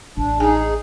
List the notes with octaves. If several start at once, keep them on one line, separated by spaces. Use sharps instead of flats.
A1 D4
D#4 G#4 G#5